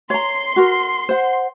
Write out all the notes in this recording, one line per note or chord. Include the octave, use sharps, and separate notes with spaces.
C#5 A#5 C6
F#4 A#4
C5 F#5